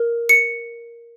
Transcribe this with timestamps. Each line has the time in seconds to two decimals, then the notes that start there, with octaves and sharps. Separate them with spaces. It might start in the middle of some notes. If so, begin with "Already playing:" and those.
Already playing: A#4
0.29 C#7